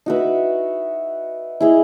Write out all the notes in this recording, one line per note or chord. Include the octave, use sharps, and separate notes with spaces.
D#4 F#4 B4 E5
E4 G#4 D#5